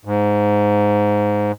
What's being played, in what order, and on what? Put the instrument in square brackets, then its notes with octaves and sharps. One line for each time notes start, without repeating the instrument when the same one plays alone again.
[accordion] G#2